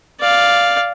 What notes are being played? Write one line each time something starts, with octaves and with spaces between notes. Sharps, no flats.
D5 F5